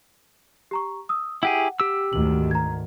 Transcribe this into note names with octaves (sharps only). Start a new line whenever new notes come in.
G4 A#5 C#6
D#6 E6
E4 G4 G#4 F#5
G4 E6
D2 G#2 D#3 F#7
A#5 G#6